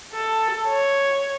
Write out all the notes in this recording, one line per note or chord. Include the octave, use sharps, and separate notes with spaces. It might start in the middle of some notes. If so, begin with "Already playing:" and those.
A4
C#5